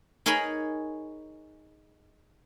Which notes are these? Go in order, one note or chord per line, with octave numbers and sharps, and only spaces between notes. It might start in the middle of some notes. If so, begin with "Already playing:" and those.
D#4 G#4 A#4 C#5 G#5 B5